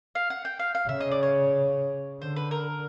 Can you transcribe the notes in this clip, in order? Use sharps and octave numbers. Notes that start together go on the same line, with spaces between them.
F5
F#5
G5
F5
F5
C#3 E5
D#5
D5
C#5
D3 C5
B4
A#4